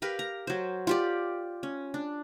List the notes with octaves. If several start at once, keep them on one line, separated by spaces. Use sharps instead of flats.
G4 A#4 B4 F5
A#5
F#3 C5
F4 G4 D5
C#4
D4